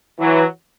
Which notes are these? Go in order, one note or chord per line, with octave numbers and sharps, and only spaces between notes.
E3 F#3